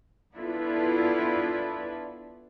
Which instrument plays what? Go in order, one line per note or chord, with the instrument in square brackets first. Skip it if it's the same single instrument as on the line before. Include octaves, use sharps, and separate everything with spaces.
[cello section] B3 D4 E4 F4 A4 B4